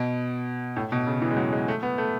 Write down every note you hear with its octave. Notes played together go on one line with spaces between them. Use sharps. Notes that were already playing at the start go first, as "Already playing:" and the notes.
Already playing: B2
A2
B2
C#3
E3
G#3
F#3
G#3
A3
B3
A3